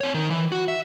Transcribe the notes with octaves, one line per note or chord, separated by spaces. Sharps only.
C4 C#5
D#3
E3
F#4
E5